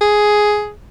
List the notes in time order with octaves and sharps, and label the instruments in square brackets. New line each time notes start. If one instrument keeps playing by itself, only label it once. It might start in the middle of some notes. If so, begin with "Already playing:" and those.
[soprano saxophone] G#4